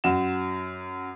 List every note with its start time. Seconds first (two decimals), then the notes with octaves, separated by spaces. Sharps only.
0.04 F#2 F#4 E7